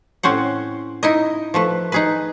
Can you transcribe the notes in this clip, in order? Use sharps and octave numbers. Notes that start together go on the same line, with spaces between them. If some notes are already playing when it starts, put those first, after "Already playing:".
A2 C4 C#4 C5 F#5
D#4 E4 D#5
F3 A3 B4
D#4 G#4 B4